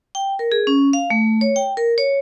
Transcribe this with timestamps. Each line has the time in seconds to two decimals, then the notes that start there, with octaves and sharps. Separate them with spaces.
0.15 G5
0.39 A#4
0.52 G#4
0.67 C#4
0.93 F5
1.10 A3
1.41 C#5
1.56 G5
1.77 A#4
1.98 C#5